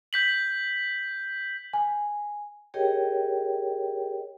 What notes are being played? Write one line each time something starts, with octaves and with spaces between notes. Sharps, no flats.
G6 B6 F#7
G#5
G4 G#4 A#4 C#5 D#5 G5